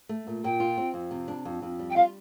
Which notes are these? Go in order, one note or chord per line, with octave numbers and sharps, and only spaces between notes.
A3
A#2
A#2 G5
F4
C4
F2
C3
D4
F2
F2
G3
G5
F4 F5